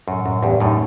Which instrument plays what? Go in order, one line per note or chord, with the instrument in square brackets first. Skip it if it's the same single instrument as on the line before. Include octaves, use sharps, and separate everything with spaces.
[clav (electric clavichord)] F#2 [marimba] A2
[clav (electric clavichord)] F#2 [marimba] A2
[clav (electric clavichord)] E2 G2 [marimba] G4
[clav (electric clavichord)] F#2 A2 [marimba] D#4